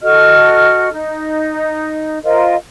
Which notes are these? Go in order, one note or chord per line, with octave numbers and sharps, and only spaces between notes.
F#4 A4 D#5 F6
D#4
F4 A#4 C5 D#5